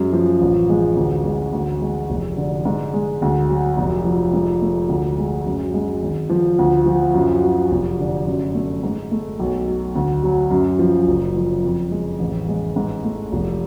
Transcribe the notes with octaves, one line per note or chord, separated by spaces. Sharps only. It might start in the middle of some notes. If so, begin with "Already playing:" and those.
Already playing: F#2 G#3
F3
A1
G#3
D2
G#3
D2
G#3
F1
D3
G#2
G#3
D2
F#3
F1
F3
G#2
A3
D2
G#3
F#2
G#3
G#1
F3
D2
F3
F#2
F#3
F1
D3
F#2
A3
G#2
A3
B1
F#3
D2
F#3
F#2
F3
F#1
F3
F2
G#3
A1
G#3
G#2
A3
F1